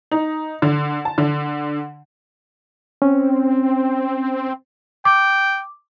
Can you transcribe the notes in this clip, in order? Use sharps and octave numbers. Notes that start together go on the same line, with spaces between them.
D#4
D3
A5
D3
C4 C#4
G5 D6